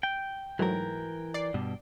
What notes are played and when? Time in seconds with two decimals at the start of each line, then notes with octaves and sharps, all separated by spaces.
0.03 G5
0.59 G#2 E3 F#3 A3 A#4
1.34 D5 C7
1.54 G2 B2